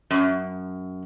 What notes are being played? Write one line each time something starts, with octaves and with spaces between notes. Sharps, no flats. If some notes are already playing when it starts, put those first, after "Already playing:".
F#2